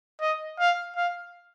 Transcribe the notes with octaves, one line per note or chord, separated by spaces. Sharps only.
D#5
F5
F5